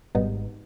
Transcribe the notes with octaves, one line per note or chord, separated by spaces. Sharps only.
G#1 G#2 B2 G3 B3 D#4